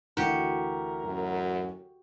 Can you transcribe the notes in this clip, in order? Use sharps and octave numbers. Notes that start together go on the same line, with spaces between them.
D2 E3 F#4 G4 A#4
F#2